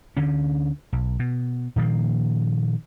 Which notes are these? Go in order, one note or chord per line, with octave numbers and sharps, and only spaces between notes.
D2 D3 C#4
B1
B2
A#2 D#3 F3 A#3